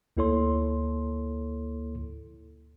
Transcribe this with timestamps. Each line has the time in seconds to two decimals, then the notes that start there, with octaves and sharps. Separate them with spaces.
0.17 D2 A#3 E4 A4 C#5 C6